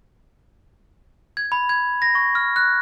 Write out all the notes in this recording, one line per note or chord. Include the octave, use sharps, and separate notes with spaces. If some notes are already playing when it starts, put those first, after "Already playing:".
G#6
B5
G#6
A#6
C#6
F6
F#6